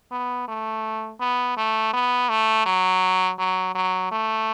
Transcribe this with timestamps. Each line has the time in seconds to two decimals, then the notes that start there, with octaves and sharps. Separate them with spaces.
0.11 B3
0.48 A3
1.20 B3
1.57 A3
1.93 B3
2.29 A3
2.66 F#3
3.39 F#3
3.75 F#3
4.12 A3